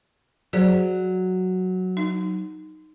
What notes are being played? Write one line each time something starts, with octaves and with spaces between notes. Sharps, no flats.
F#3 G#4 C5 D5
D#4